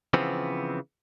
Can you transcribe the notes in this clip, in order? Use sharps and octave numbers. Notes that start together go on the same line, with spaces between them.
C#3 E3 F3 B3 C4